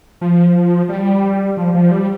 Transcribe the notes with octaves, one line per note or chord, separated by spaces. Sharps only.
F3
G3
F3
F3
G3